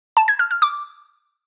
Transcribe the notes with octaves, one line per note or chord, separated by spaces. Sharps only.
A5
G#6
F6
F6
D6